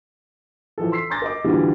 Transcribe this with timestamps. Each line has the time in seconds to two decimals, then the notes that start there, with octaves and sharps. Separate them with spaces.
0.78 E3 F3 A4
0.92 C6 E6 B6 C7
1.10 A#5 C6 D6 G6 A6 A#6
1.22 A#4 D#5 D6
1.44 D3 E3 G3 F4 F#4